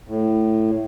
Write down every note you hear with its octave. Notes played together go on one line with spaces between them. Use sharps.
A2